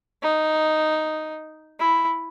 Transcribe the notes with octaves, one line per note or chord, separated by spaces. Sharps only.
D#4
E4